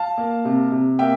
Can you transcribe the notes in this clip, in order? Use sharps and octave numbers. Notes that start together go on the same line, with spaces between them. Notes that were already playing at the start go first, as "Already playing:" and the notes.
Already playing: F5 A5
A#3
C3
C3
A#3 E5 G5